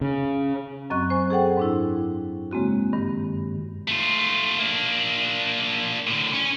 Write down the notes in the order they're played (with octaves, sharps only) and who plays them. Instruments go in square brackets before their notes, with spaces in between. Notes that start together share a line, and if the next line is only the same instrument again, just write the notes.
[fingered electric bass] C#3
[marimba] F#2 F#3 C4 D#5 C#6 F#6
C5 G#5 C#6
G#4 A4 F#5 G5
G#2 D4 E4
C#3 G#3 A#3 C4 F#4
G2 D#3
[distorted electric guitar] A3 F4
A#3 D4
A2 D3
C#4